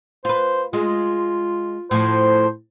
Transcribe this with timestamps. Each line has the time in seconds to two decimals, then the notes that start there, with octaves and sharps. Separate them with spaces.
0.25 F4 B4 C5
0.73 G#3 F4
1.91 A2 F3 C5